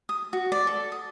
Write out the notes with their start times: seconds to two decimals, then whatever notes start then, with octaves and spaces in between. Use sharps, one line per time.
0.09 D#6
0.33 F#4
0.52 D5
0.67 A4
0.92 D#6